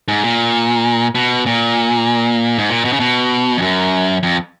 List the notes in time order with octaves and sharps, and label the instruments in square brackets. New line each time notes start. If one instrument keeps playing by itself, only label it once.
[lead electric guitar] G#2
A#2
B2
A#2
G#2
A#2
B2
C#3
B2
F2
F#2
F2